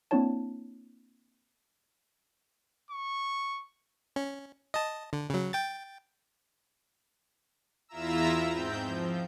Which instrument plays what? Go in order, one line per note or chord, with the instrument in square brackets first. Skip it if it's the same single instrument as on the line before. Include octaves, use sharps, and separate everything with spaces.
[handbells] A#3 C4 D4 E4 C#5 A5
[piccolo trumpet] C#6
[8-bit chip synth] C#4
D#5 A5
D3
C#3 F#3
G5 A6
[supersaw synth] E2 E4 F4 E5 A#5 E6
G#2 C4 G6
F3